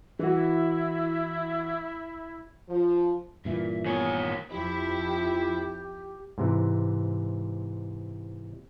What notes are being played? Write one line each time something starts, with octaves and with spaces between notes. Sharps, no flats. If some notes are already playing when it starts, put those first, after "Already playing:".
E3 E4 F#4
F3
G2 A#2 E3 E5
D#3 B3 G#4 C#5
F2 F3 E4 G4
G#2 C3 E3